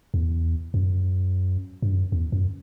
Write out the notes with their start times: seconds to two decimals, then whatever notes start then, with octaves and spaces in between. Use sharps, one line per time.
0.14 E2
0.74 F#2
1.82 G2
1.93 F#2
2.12 E2
2.32 F#2